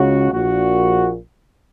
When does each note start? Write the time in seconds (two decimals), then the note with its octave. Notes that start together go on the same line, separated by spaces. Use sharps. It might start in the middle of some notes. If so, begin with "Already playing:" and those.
Already playing: C#2 C#3 F#4
0.32 A#1 A#2 F#4